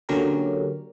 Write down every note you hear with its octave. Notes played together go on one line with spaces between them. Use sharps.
D3 F#3 A#3 C#4 G4 A#4